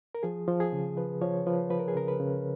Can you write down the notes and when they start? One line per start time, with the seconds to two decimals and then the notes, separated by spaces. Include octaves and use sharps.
0.15 A#4
0.23 F3 G#4
0.47 F3
0.60 G#4
0.72 C#3
0.97 F3 B4
1.21 F3 C#5
1.47 F3 B4
1.70 F3 B4
1.79 A#4
1.88 G#4
1.95 C#3 A#4
2.08 B4
2.20 C#3